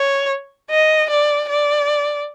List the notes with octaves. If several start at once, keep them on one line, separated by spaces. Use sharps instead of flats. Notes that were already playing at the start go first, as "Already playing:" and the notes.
Already playing: C#5
D#5
D5
D5